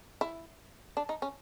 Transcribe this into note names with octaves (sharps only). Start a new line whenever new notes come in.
E4
D4
D#4
C#4